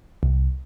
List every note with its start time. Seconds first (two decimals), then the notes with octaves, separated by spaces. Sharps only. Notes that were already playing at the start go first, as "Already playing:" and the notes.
0.23 C2